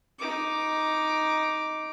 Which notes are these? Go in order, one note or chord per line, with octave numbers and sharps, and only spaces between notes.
D#4 D6